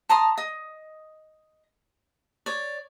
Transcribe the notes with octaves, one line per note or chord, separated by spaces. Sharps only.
A5 A#5 C6 D#6
D#5
C#5 D5